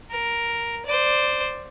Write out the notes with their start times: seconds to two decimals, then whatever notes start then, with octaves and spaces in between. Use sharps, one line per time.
0.11 A#4
0.86 C5 D5